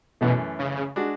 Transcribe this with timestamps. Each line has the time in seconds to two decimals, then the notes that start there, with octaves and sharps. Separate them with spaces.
0.21 F#2 B2 E3 A3
0.59 C#3
0.96 G#3 D4 F#4